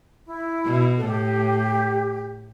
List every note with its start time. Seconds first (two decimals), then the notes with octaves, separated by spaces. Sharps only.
0.25 E4
0.66 B2
0.98 A4
1.06 A2 G4